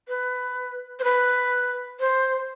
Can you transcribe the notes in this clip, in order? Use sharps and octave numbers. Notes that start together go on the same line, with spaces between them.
B4
C5
B4
C5